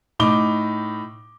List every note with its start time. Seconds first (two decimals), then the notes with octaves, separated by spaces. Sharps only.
0.19 A2 D#4 D6 G7